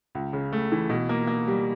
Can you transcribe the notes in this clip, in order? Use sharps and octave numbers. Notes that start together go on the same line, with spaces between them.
C#2
C#3
A3
E3
B2
A#3
A#3
G3